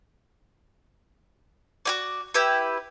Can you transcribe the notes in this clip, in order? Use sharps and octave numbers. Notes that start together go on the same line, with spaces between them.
F#4 G4 D5
E4 G4 B4